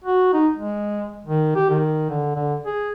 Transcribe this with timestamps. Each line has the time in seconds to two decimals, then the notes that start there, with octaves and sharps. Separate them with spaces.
0.04 F#4
0.33 D#4
0.57 G#3
1.26 D#3
1.55 G4
1.70 D#3
2.10 D3
2.35 D3
2.66 G#4